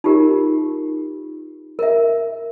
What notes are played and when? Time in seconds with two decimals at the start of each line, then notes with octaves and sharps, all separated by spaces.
0.04 D#4 F4 G4 A#4
1.79 A#4 E5